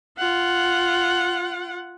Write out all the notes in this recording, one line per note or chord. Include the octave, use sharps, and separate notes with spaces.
F4 F#5